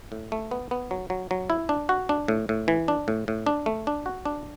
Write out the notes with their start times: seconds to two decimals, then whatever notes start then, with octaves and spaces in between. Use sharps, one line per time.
0.12 A2
0.32 A3
0.51 B3
0.71 B3
0.91 F#3
1.10 F#3
1.31 F#3
1.50 E4
1.69 D4
1.89 F#4
2.09 D4
2.28 A2
2.49 A2
2.68 E3
2.88 D4
3.08 A2
3.28 A2
3.46 D4
3.66 A3
3.87 D4
4.06 F#4
4.25 D4